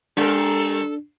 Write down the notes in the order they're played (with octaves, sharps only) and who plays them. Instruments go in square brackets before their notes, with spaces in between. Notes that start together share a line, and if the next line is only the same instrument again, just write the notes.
[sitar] G3 A#4 [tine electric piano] D4 [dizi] A4